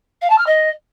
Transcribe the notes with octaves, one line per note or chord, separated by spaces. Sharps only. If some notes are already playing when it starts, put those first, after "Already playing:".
F5
A5
F6
D#5